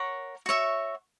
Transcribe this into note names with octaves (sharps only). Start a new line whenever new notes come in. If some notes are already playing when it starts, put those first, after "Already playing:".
Already playing: A#4 C#5 F#5 C#6
F#4 C#5 E5